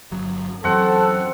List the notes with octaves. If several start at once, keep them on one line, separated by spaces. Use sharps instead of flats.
G1 F#3
F#2 E3 F#3 C4 A4 F#5